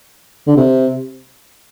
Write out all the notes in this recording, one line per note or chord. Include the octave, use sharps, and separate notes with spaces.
D3
C3